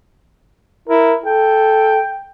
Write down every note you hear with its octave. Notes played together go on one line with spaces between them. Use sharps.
E4 A#4
A4 G5